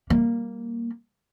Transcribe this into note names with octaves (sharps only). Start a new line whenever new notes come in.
G3 A#3